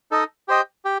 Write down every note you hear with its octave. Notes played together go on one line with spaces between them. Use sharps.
D#4 A4 D#5
G4 C5 D#5 G5
G4